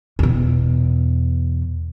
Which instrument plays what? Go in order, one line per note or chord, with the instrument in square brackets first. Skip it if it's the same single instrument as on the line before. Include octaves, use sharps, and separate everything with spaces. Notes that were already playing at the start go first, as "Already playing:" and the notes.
[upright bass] E2 B2